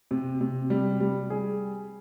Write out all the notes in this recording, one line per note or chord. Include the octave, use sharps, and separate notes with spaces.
C3
C3
G3
G3
G#4